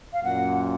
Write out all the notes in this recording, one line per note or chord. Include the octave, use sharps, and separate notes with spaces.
F5
F#2 A#2 F#5